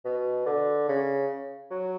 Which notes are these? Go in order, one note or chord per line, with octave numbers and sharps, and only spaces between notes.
B2
D3
C#3
F#3